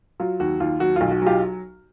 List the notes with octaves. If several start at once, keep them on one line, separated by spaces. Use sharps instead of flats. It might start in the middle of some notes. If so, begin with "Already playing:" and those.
F#3 F4
D#2 F#4
D#2 F4
F#3 F#4
B1 F4
F#4
F#3 F4 G4